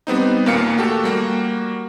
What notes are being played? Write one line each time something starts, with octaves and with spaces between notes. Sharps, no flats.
G3 B3 C4 D#4
D#2 A#2 A#3 F5 C#7
A3 F#4 G4 A4
G3 A#3 F#4